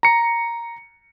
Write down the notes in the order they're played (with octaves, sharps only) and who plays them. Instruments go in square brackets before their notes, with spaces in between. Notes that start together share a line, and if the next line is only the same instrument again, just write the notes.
[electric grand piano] A#5 C#7